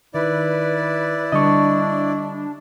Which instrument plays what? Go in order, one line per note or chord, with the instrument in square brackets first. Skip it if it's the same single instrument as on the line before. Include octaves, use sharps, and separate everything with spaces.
[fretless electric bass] D#3 [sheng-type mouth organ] E4 D5 [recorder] B4
[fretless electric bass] D3 G3 [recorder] D4 [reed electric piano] D#5 C#6